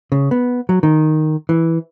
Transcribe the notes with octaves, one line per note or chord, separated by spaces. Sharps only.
C#3
B3
F#3
D#3
E3